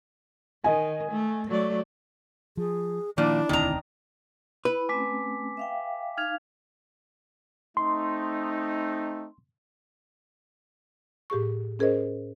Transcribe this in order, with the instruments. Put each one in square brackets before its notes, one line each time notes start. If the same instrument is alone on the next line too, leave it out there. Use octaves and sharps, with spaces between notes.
[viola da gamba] D#3 [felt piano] D#5 G#5
[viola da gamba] A3
F#3 A3 D5
[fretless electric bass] F3 [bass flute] G#4
[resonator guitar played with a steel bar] A#2 [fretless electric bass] D#3 F3 [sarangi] D4 [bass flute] E4
[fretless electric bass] E1 D2 C4 [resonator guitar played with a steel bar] D#3 A#5
[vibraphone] E4 B5 [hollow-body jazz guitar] B4
[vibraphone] A3 C4 C#4 [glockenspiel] G#5 D6 B6
[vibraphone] E5 F5 G5
[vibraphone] D#4 F5 [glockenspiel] F6 G#6 F7
[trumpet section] A3 C4 D#4 [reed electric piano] C6
[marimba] A2 G4 G#4 C#6
C#4 G#4 A#4 C5 D#5